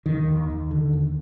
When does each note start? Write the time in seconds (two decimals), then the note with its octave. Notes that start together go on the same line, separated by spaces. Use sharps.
0.06 D#2 D#3
0.28 D#2
0.50 D#2
0.71 D3
0.93 D#2